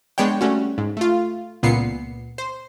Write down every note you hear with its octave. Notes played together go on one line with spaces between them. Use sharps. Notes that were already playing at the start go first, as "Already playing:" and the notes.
G#3 B3 D4 C#5 G5
G3 A3 C#4 F#4
G#2
A3 F4
C#2 A#2 B3 C7 C#7
C5